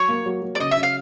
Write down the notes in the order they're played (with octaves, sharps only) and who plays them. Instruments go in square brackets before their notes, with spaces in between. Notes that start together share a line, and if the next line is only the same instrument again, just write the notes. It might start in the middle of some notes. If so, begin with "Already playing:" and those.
Already playing: [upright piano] F#3 [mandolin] C#5
[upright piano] A#3
F#3
F#3
[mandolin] D5
[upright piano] C#3 [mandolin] D#5
[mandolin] E5
[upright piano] C#3
[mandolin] F5